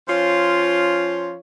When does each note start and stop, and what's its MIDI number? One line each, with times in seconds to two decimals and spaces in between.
0.08 1.37 53
0.08 1.37 61
0.08 1.37 65
0.08 1.37 73